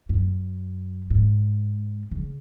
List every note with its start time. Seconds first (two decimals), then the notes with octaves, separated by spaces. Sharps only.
0.09 F#2
1.10 G#2
2.11 C#3